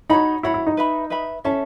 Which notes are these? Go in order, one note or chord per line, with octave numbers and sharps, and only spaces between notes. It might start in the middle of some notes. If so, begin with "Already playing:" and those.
D#4 F#4 C#5 F#5 B5
E4 F#4 C#5 F#5 B5
E4
D#4
B4 E5 B5
B4 E5 B5
C#4 A4 E5 A5